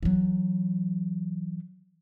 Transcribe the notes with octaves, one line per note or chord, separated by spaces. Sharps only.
E3 F#3